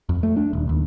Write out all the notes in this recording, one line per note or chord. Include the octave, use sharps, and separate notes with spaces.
F2
A3
D4
D#1
D#2